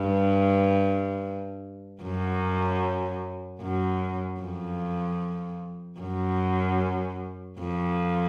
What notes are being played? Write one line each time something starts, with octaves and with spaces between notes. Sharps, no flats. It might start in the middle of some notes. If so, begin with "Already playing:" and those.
Already playing: G2
F#2
F#2
F2
F#2
F2